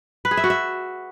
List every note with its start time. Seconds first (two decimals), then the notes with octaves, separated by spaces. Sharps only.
0.25 B4
0.31 G#4
0.37 E5
0.44 F#4
0.50 E5